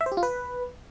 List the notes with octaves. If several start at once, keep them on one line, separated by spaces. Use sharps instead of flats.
E5
C5
G4
F4
B4